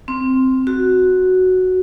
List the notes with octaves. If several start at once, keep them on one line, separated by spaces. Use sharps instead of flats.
C4
F#4